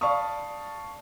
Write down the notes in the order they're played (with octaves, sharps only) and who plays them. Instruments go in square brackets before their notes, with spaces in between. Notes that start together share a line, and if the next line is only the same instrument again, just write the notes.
[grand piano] D5 F5 A5 B5 C#6 D#6